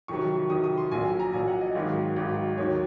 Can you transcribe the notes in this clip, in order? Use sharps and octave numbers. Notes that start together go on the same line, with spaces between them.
F2 C3 D#3 F#3 C#6
F2 C3 D#3 F#3 D#6
D#6
C6
A#1 A#2 F#3 G#5
G#5
A#5
A#1 A#2 F#3 G#5
F#5
D#5
G#1 G#2 D#3 F#3
G#1 G#2 D#3 F#3
D#2 D#3 F#3 C#5